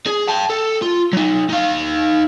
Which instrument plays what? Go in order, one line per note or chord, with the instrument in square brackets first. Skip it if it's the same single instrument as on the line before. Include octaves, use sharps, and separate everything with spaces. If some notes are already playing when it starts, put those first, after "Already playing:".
[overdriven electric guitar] G#4
G5 A5
A4
F4
F#3 D#4
D#4 F5